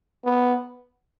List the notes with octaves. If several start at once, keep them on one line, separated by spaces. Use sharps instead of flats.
B3